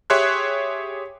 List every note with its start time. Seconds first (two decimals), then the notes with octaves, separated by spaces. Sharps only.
0.10 G4 G#4 C#5 E5 C6 F#6